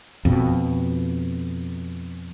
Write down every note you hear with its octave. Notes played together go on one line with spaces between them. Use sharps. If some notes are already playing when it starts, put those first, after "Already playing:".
F2 B2